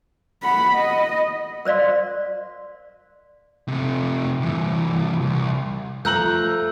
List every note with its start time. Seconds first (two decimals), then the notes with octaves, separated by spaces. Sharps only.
0.43 F#5 B5
0.75 D#5
1.65 A#4 C5 D5 F5 C6
3.68 C3 A3
4.41 C2 E3
5.21 C2
6.05 F3 A3 A#5 E6 F#6 G6 F#7